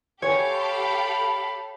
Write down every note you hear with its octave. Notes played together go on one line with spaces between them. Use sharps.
F#4 G4 A4 B4 C#5 F5 G#5
A5 B5